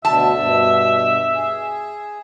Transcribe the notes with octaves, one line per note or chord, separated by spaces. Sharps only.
D2 B2 D3 E5 A5
G2 B2
G#4